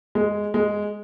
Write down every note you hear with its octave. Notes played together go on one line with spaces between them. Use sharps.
G#3
G#3